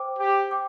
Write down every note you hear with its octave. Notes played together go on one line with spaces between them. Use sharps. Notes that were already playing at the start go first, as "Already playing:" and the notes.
Already playing: C5 G5 D6
G4
G5 D6